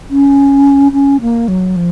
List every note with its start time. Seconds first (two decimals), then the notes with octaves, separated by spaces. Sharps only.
0.10 C#4
0.92 C#4
1.21 A#3
1.48 F#3
1.76 F3